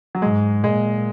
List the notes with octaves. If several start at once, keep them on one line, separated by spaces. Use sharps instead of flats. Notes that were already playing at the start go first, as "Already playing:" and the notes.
F#3
G#2 G#3
A#2 G#3